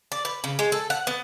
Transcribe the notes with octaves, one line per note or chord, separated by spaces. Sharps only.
D5
B4
C#3
G#3
A4
F#5
B3